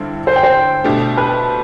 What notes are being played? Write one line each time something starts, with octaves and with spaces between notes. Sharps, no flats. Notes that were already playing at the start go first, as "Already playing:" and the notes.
Already playing: G2 D3 C4 E4
C5
G5
C5
B2 A3 D4 G4
B4